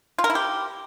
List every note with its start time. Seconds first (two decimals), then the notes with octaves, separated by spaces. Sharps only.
0.18 F4
0.24 A#4
0.30 E4
0.35 G4